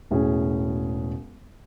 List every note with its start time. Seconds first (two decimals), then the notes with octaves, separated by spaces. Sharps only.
0.11 E1 A2 C#4 G#4